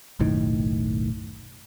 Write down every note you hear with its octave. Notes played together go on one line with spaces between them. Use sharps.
F#1 B1 A2 D#3